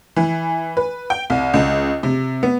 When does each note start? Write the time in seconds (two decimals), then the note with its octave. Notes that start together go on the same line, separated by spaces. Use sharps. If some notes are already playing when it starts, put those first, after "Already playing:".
0.16 E3
0.77 B4
1.10 G5
1.30 C2
1.54 C#2
2.03 C3
2.43 B3